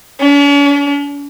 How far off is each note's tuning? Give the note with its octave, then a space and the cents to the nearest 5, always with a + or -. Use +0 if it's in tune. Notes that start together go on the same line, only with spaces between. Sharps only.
C#4 +45